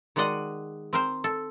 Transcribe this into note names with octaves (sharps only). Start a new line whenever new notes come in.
D#3 G#3 F#4 D5 D#5 F#5
C4 A#4 C5
A4